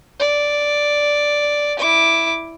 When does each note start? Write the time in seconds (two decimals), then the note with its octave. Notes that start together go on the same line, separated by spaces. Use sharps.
0.19 D5
1.79 E4 D6